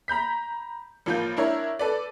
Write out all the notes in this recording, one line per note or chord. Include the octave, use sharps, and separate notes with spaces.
A#5 B5 G6 B6
A1 F3 A#3 F4 G6
D4 E4 A#4 C#5
A4 B4 D5